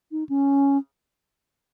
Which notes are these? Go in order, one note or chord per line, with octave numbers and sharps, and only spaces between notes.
D#4
C#4